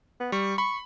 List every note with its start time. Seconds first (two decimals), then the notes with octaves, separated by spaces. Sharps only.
0.20 B3
0.32 G3 C#6
0.58 B5 C#6